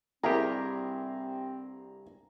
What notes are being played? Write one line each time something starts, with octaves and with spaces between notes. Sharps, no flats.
C2 G2 C4 E4 G4 G#4 A#4 A#5